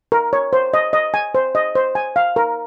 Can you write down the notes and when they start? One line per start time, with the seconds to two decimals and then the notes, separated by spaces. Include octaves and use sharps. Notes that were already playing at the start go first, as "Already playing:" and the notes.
0.12 A#4
0.33 C#5
0.53 C5
0.74 D#5
0.93 D#5
1.14 G#5
1.35 C5
1.55 D#5
1.75 C5
1.95 G#5
2.16 F5
2.36 A#4